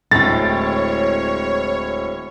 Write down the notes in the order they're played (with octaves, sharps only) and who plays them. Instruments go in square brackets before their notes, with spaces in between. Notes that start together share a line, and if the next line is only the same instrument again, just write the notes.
[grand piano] D1 A2 [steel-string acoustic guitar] G#3 C4 [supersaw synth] C#5 [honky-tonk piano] A6